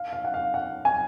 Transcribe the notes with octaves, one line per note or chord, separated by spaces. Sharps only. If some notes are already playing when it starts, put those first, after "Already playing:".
Already playing: F5
F5
F#5
F5
F#5
G#5